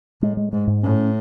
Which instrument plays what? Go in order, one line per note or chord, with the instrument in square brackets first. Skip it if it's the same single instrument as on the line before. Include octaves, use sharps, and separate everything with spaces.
[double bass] A2 [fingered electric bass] G#3
[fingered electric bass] G#3
[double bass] G#2 [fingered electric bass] G#3
[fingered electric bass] G#2
[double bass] A2 [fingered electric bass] C#4